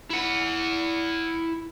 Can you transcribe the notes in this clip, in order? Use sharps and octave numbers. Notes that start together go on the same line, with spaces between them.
E4 F#5